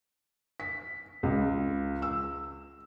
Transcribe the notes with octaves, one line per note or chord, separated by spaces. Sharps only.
B6
C#2
E6